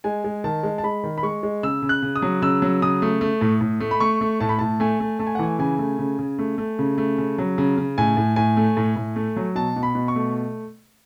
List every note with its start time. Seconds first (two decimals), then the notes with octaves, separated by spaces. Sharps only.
0.04 G#3 G#5
0.24 G#3
0.44 D#3 A5
0.63 G#3
0.78 A5
0.83 G#3 B5
1.04 D#3
1.18 B5
1.23 G#3 C#6
1.43 G#3
1.63 C#3 E6
1.82 C#3
1.89 F#6
2.02 C#3
2.16 D#6
2.22 F#3
2.42 C#3 E6
2.62 F#3
2.82 C#3 D#6
3.02 A3
3.21 A3
3.41 A2
3.61 A2
3.80 A3
3.91 B5
4.00 A3 C#6
4.21 A3
4.40 A2 A5
4.49 B5
4.59 A2 A5
4.80 A3 G#5
5.00 A3
5.19 A3 A5
5.27 G#5
5.35 F#5
5.39 E3 G#5
5.59 C#3 G#5
5.79 A3
5.99 C#3
6.19 C#3
6.39 A3
6.58 A3
6.79 C#3
6.98 A3
7.18 C#3
7.38 F#3
7.58 C#3
7.78 C#3
7.98 A2 G#5
8.17 A2
8.36 A2 G#5
8.57 A3
8.77 A2
8.96 A2
9.16 A3
9.36 F#3
9.55 B2 A5
9.76 B2
9.83 B5
9.95 B2
10.08 C#6
10.16 A3